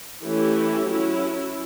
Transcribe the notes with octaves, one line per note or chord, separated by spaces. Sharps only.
E3 A3 C#4 E4 G4
F#3 C#4 E4